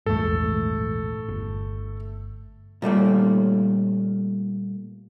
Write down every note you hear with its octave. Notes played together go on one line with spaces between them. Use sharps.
A#1 E2 G#2 A3 A4
G1
A#2 G3 A3 A#3